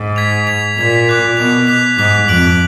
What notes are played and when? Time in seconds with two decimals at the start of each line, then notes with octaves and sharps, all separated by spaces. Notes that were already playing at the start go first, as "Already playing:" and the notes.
Already playing: G#2
0.16 G#6 B6 F7
0.47 G#6 B6 F7
0.77 A#2 G#6 B6 F7
1.08 D6 F#6 B6 F7
1.37 B2 D6 F#6 B6 F7
1.67 D6 F#6 B6 F7
1.97 G#2 D6 F#6 B6 F7
2.28 F2 F#6 D7 F#7